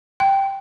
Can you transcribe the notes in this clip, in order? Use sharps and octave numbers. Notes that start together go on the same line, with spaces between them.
G5